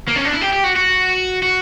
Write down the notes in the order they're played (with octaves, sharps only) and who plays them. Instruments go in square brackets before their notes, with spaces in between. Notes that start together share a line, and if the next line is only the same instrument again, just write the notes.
[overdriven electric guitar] A#3
C#4
D4
E4
G4
G4
F#4
F#4
F#4